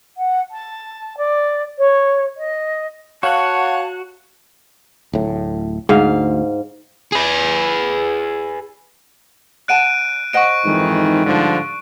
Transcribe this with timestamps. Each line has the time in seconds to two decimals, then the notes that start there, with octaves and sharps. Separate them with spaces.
0.17 F#5
0.51 A5
1.17 D5
1.78 C#5
2.37 D#5
3.23 F#4 C#5 F5 F#5 A5 F#6
5.13 D1 A2
5.89 D2 G#2 F5
7.12 G#4 B4
9.68 D5 F#5 A5 F#6 D7 D#7
10.33 C5 D#5 F#5 C#6 F#6 D7
10.65 F2 G#2 D#3 E3
11.26 G2 D3 F3